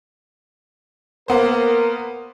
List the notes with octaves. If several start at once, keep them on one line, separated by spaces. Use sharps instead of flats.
A#3 B3 A#4 C5